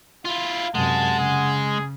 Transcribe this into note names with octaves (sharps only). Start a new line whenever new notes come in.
E4 F4 F5
F#2 C3 G#3 F#5 A5
C#3 G#4